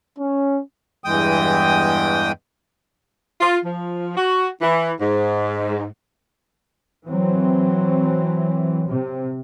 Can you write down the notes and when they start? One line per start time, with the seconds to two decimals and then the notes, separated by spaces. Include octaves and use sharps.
0.18 C#4
1.04 E2 G2 E3 G#3 G5 D#6
3.41 F4
3.64 F3
4.16 F#4
4.61 E3
5.00 G#2
7.07 E3 F#3 C4
8.88 C3